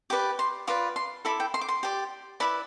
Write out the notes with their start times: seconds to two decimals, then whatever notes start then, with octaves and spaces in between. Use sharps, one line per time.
0.10 G4 B4 D5 D6
0.39 C6
0.67 F4 B4 D5 D6
0.96 C6
1.25 E4 A4 D5 B5
1.40 G5
1.54 C6
1.61 D6
1.68 C6
1.83 G4 D5
2.40 E4 B4 D5 B5